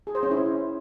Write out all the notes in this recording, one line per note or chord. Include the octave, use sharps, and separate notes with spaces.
G#4
C5
C#4
E4